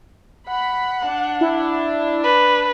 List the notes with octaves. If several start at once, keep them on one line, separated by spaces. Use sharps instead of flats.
F#5 B5
D4
E4
B4